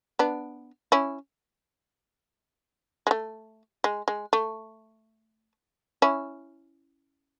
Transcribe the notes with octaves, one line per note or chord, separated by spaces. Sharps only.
B3 D4
C#4 E4
G#3
A3
G#3
G#3
A3
C#4 E4